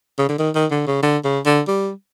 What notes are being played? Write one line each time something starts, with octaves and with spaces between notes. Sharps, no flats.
C#3
D3
D#3
D#3
D3
C#3
D3
C#3
D3
G3